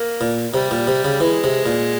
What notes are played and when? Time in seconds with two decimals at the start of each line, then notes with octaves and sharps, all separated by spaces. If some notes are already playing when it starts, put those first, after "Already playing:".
Already playing: A#3
0.21 A#2
0.54 C3 G3
0.71 A#2
0.87 C3
1.05 C#3
1.20 E3 G#3
1.44 C3
1.66 A#2